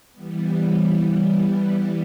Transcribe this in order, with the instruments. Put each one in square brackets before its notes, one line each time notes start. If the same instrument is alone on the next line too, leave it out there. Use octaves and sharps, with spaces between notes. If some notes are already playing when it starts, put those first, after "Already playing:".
[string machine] E3 G3 B3